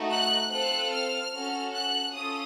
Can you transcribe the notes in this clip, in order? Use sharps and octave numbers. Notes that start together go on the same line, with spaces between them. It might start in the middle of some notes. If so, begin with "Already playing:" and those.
Already playing: A3 D#4 F#4
F#6
C4 F4 A4 F#6
F6
C#4 F#4 A4
F#6
C#4 F4 A4 D#6